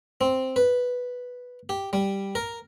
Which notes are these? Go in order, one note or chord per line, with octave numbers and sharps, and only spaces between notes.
C4
B4
G4
G3
A#4